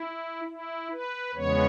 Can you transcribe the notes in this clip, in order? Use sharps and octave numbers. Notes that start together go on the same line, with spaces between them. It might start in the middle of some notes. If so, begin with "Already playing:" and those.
Already playing: E4
E4
B4
E2 C#3 G#3 B3 C#5